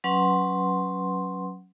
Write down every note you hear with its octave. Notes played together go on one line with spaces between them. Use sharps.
F#3 C#4 B4 F#5 C6